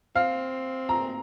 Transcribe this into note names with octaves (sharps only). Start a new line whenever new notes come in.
C4 F5
A#5